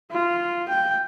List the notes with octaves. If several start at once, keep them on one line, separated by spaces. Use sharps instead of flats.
F4
G5